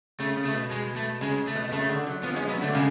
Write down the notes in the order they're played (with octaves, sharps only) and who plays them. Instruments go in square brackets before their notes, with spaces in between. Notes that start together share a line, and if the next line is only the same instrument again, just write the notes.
[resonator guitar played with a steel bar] C#3 [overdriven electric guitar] A3
[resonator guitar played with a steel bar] C#3
[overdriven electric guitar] A3
[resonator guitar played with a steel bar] B2
[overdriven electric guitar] G#3
A3
[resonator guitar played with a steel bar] C#3 [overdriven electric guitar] G#3
[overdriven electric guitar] A3
[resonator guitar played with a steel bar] B2
B2
[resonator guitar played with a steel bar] C#3 [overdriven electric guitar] A3
[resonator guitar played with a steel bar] D3
F#3
[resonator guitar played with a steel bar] F3 [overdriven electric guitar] B3
[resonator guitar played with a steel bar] G#3 [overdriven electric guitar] C#4
[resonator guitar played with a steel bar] F#3 [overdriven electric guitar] B3
[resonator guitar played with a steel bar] D3 [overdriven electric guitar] A3
[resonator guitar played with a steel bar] C#3 [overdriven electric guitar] G#3